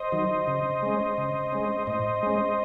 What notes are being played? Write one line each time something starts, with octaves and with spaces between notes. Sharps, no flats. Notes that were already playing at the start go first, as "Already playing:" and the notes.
Already playing: C5 D#5
D#3 F#3
C#3
G#3 C#4
C#3
G#3 C#4
A2 C5 D#5
G#3 C#4